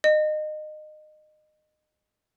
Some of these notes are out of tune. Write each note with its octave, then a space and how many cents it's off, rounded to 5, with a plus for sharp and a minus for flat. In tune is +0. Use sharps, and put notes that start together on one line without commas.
D#5 -25